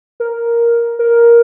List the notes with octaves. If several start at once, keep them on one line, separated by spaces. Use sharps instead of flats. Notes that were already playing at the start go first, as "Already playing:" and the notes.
A#4
A#4